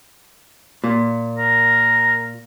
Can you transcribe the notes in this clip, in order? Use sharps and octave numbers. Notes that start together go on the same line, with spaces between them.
A#2
A#4